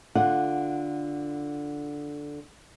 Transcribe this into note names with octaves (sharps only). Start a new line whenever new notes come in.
D3 F4 F#5